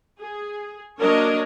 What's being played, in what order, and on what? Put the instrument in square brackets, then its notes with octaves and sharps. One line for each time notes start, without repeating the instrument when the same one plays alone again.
[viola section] G#4
F#3 A#3 D4 A#4 C#5 D#5